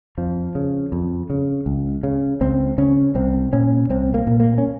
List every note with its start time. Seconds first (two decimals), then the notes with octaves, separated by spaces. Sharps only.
0.18 F2 F3
0.55 C#3
0.92 F2
1.30 C#3
1.66 C#2
2.03 C#3
2.41 C#2 C4
2.78 C#3 C#4
3.15 C2 C4
3.53 A#2 C#4
3.90 C2 C4
4.14 A#3
4.27 A#2
4.40 A#3
4.58 C#4